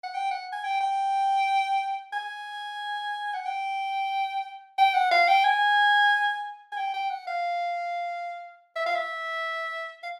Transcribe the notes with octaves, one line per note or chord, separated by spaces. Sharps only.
F#5
G5
F#5
G#5
G5
G5
G#5
F#5
G5
G5
F#5
F5
G5
G#5
G#5
G5
G5
F#5
F5
E5
F5
E5
F5